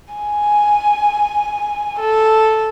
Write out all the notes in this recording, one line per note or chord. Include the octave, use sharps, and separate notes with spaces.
G#5
A4